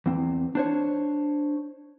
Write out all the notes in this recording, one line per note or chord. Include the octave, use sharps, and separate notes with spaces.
E2 C4
D4 C5 C#5